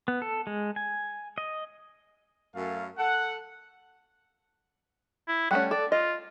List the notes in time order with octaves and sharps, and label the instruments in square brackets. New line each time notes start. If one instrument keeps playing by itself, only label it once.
[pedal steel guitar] B3
A4
G#3
G#5
D#5
[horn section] F#2 A3 F5
A4 F#5
[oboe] E4
[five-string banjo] G3 A3 C#4 [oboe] F#5
[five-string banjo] A4 [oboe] D5
[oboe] F4 [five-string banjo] D#5